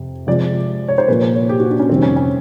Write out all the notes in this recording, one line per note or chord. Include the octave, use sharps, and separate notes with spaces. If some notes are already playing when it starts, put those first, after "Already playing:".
Already playing: F2 C3
C3 F3 G#3 D5
C#5
C5
A#2 F3 A#3 B4
C5
C#5
G4
F#4
D4
C#4
F2 C3 D#3 G3 C4
C#4
C#4